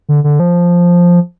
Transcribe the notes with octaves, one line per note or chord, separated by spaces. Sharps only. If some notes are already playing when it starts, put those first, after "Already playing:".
D3
D3
F3